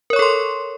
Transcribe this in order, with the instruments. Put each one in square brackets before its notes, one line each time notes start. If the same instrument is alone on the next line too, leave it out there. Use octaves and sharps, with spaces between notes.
[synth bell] A#4
C#5
C#6
A4
C6